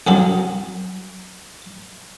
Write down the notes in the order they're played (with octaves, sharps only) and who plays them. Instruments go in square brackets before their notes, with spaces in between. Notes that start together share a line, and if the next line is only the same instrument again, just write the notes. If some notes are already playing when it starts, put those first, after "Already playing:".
[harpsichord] C2 F#2 F#3